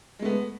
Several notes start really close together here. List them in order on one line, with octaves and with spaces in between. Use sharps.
G#3 A3 B3